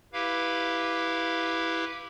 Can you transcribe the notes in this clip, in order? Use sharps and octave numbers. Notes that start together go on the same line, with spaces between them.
E4 G4 B4 F5